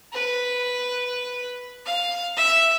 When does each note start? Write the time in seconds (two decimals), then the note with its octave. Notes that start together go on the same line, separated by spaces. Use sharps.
0.13 B4
1.86 F5
2.37 E5